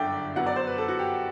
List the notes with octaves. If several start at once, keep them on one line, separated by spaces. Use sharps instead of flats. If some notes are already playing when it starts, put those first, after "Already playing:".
Already playing: G1 F#2 D3 D5 E5 G5
F#2 F#3 B3 F#5
D5
C5
B4
A4
F#4
G4